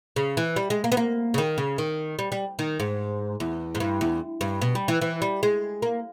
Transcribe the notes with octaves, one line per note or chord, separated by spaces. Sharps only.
C#3
E3
G3
G#3
A#3
B3
A#3
C#3
D#3
C#3
D#3
G3
G3
D#3
G#2
E2
G#2
G2
E2
G2
B2
G3
E3
E3
G3
G#3
A#3